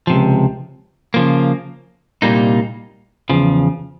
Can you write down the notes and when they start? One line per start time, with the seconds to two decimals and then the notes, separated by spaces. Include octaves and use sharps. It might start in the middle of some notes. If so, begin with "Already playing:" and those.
0.07 C#2 C3 F3
1.14 C#3 F3 A#3
2.22 C2 A#2 G3 A#3 D#4
3.29 E2 C#3 F3